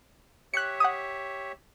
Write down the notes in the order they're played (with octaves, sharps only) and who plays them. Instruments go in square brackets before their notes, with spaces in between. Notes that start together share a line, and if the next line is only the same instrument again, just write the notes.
[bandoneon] G4 C#5 E5 [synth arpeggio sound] F#6 C#7
[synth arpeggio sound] F#5 D#6